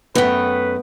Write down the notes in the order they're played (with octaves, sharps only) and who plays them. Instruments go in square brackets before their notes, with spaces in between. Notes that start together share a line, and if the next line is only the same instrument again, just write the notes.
[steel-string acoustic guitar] F#2 A3 [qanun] B3 G5 [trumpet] B4